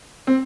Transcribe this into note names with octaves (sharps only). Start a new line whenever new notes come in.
C4